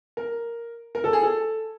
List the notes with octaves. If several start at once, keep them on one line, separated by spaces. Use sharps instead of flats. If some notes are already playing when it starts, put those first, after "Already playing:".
A#4
A#4
A4
G#4
A4